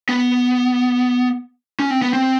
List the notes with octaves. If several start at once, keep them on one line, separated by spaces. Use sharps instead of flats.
B3
C#4
C4
B3
C4